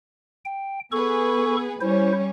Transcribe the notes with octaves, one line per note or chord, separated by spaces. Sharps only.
G5
B3 G#4 A4 B4 C#6
G3 C#4 E4 C5